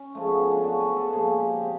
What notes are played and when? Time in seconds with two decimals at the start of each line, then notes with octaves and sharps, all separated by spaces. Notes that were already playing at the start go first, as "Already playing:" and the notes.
Already playing: C#4
0.15 C#3 F3 G#3 A3
0.27 B3
0.39 C#4
0.51 D4
0.64 C#3 F#3 F#4
0.80 B4
0.97 A4
1.13 A#2 F3 G#3 G#4
1.38 G4
1.62 C3